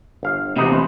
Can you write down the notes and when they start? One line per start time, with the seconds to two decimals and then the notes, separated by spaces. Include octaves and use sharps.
0.23 G1 F5
0.56 E2 C3 B3 D#4 G4
0.72 C#4 B4 C5